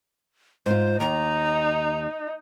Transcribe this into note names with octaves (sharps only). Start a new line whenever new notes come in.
G#2 F4 C5
D#2 D#4 A#5